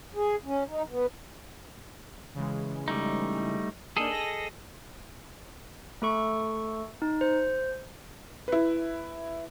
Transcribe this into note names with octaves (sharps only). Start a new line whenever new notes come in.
G#4
C#4
D#4
B3
C#3 E3 G#3
G3 A3 D#4
A#3 D4 D#4 G#4 A4 D#5
A#6
A3 A4 C#6
D#4
C5
E4 B4